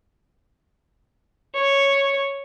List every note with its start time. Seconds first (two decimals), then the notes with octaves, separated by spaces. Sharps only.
1.54 C#5